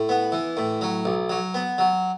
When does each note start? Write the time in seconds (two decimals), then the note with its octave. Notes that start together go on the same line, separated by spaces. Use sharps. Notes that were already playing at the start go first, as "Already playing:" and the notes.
Already playing: A2
0.09 B3
0.32 E3
0.57 A2
0.81 F#3
1.05 B1
1.30 F#3
1.54 B3
1.78 F#3